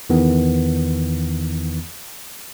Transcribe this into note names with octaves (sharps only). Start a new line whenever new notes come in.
E2 D#3 E3 B3